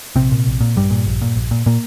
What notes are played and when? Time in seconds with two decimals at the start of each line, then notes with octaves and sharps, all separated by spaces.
0.16 A#1 C3 C4
0.31 A#2
0.47 A#1
0.61 A#2
0.77 A#1 G2 G3
0.91 A#2
1.07 A#1
1.22 A#2
1.36 A#1
1.51 A#2
1.66 A#2 A#3